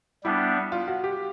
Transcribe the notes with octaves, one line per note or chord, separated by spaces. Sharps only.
G3 B3 D4 E4
F4
F#4
G4